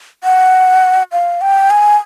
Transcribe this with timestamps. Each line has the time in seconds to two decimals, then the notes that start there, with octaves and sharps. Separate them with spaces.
0.24 F#5
1.12 F5
1.41 G5
1.70 G#5